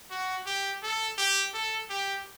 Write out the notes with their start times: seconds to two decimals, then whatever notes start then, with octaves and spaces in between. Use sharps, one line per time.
0.11 F#4
0.46 G4
0.83 A4
1.18 G4
1.54 A4
1.90 G4